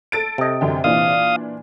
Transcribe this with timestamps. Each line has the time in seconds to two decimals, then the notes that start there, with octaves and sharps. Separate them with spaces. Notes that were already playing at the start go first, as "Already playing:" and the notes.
0.12 A4 A6 D7
0.38 C3 D#5
0.61 F#2 D3 G5
0.84 A#2 E3 D4 F5 D#6